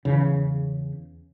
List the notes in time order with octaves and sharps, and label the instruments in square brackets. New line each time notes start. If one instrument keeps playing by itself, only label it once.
[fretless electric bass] E2 C#3